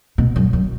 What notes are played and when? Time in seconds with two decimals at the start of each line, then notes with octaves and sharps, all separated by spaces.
0.18 B2
0.36 F#2
0.53 F#2